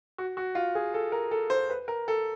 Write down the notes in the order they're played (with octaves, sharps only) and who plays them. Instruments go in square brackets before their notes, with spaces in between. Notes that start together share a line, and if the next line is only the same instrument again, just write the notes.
[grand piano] F#4
F#4
F4
G#4
A4
A#4
A4
C5
B4
A#4
A4